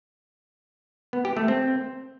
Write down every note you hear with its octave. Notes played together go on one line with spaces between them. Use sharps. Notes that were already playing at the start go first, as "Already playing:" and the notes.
B3
G4
A3
C4